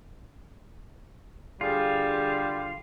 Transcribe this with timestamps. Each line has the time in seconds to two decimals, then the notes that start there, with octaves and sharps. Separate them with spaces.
1.61 D3 G3 F4 G#4